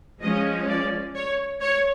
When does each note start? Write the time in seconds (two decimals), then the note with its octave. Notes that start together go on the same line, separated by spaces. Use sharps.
0.21 F3 G#3 C#4 D#5
0.68 D5
1.15 C#5
1.62 C#5